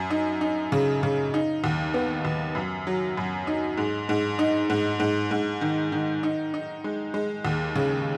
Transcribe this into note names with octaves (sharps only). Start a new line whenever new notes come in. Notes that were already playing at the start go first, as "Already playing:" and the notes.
Already playing: F#2
D#4
D#4
C#3
C#3
D#4
D#2
B3
D#2
F#2
F#3
F#2
D#4
G#2
G#2
D#4
G#2
G#2
G#2
D#3
D#3
D#4
D#4
G#3
G#3
D#2
C#3